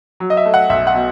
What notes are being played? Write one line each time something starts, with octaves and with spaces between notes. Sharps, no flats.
F#3
D#5
E5
A3
F#5
B1 E5
F#5
B2